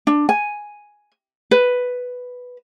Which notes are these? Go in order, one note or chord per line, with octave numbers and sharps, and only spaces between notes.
D4
G#5
B4